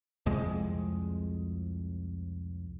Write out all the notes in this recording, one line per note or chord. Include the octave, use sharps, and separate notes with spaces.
C2 F2 G#3